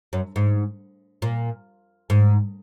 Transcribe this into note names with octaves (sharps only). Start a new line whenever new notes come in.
F#2
G#2
A#2
G#2